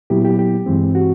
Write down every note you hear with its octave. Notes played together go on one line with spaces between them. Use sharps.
A#2 F#3 B3 E4 G4
G4
G4
G2 E3 G#3 C4
F#4